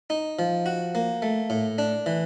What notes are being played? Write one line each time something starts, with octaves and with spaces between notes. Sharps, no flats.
D#4
F3
F#4
A#3
A3
A2
D4
E3